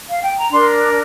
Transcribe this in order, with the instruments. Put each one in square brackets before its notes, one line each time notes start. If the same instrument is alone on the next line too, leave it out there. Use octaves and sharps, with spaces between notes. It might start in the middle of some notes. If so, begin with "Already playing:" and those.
[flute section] F5
G5
A#5
D4 A#4 C6